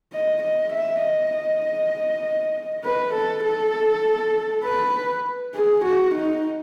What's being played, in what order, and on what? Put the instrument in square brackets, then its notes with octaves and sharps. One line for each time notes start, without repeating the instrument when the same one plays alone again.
[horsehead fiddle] D#5
D#5
E5
D#5
B4
A4
A4
B4
G#4
F#4
D#4